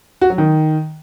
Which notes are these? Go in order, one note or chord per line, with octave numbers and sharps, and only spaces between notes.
F#4
F#3
D#3